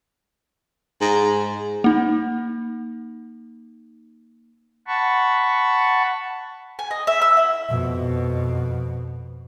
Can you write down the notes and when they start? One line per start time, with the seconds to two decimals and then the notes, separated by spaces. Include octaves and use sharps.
1.01 G#2
1.84 A#3 D#4
4.87 F#5 A5 B5 C#6
6.79 G#5
6.91 D#5
7.07 E5
7.22 E6
7.37 E4
7.69 F2 B2